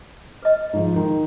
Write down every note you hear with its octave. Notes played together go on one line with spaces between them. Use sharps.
B4 D#5
G#2 F3
D#3